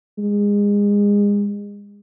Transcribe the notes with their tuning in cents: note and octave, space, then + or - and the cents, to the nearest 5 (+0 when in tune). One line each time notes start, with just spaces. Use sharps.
G#3 -30